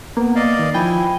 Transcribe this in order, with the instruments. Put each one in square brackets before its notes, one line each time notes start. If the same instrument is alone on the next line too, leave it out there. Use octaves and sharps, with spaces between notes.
[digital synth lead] A#3 [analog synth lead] B3
[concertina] D5 D#5 F5
[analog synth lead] D#3
[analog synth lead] F3 [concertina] E4 G#5 [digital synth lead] G5